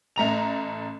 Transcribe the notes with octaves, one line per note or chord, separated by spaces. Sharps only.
A1 A3 A#5 F7